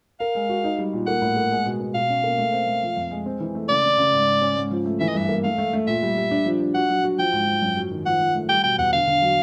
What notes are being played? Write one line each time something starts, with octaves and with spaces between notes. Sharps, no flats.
A#4 F5
G#3
F#4
D#4
G3
A#2
A#3 F#5
A2
A#3
G#3
B2
B2
B2 F5
C#4
A#3
A3
C4
A3
F3
F2
G#3
C4
E3
A3
C#3 D5
C#3
C#3
G#2
G#2
C#4
G#2
F3
A3
E3 E5
D#5
G2 E5
A#3
A3 F5
A3
A3
A#2 E5
G3
G3
D4
F3
D4
F#4 F#5
F#3
F#4
F3 G5
G#2
F3
F#2
F#3
D#3
F3 F#5
F3
A3
G3 G5
B2 G5
E2 F#5
D3 F5
D3
F#3